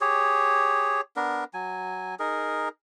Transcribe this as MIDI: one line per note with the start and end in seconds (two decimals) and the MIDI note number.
0.01 1.01 67
0.01 1.01 68
0.01 1.01 73
1.16 1.44 59
1.16 1.44 62
1.16 1.44 70
1.54 2.15 54
1.54 2.15 80
2.19 2.69 63
2.19 2.69 68
2.19 2.69 70